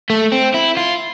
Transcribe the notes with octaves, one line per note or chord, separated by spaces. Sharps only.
A3
C4
E4
F4